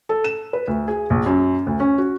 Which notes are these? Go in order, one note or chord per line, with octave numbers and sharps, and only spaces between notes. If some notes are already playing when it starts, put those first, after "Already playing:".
A4
E7
B4
D2
G#4
A#1
F#2
D2
C#4
F#4